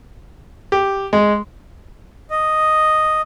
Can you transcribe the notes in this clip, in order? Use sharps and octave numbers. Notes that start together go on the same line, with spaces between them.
G4
G#3
D#5